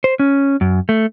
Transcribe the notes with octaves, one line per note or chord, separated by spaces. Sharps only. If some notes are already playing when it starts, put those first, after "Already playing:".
C5
C#4
F#2
A3